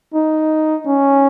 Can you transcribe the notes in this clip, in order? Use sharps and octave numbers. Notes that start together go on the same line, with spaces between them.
D#4
C#4